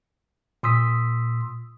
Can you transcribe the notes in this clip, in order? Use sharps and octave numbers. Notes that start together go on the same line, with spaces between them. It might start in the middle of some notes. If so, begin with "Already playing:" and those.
A#2 C6 D#6 E6 B6